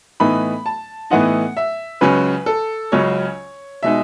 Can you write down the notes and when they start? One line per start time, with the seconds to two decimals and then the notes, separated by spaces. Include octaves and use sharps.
0.20 A2 E3 B3 D#4 B5
0.66 A5
1.10 A2 E3 B3 D#4 F#5
1.57 E5
2.01 C#2 C#3 F#3 C#4 B4
2.46 A4
2.92 C#2 C#3 F#3 C#4 C#5
3.83 B2 G#3 D#4 E5